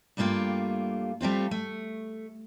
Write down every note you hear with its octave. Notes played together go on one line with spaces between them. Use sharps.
G2 G3 A3 A#3 F4
G3 A3 C4 F4
A3